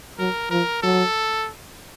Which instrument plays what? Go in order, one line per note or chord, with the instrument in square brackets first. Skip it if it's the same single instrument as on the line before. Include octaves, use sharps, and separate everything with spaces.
[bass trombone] F#3 [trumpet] A#4
[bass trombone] F3 [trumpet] A#4
[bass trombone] F#3 [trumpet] A4